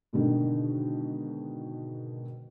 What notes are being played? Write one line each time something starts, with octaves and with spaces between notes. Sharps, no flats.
G#2 B2 D3 D#3